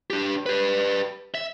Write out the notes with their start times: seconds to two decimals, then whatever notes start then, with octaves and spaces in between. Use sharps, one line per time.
0.10 D4 G4
0.46 G4 B4
1.35 E5